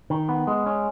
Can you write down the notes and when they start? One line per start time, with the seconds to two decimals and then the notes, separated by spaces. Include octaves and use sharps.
0.10 D#3
0.29 B3
0.47 G#3
0.66 C#4